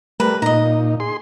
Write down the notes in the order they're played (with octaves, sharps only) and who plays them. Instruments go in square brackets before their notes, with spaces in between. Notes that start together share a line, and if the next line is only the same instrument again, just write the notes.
[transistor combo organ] G3 A3 A#4 [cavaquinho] B4
[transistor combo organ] A#2 D#4 [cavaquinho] D#5 A#5
[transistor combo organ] G#4 C6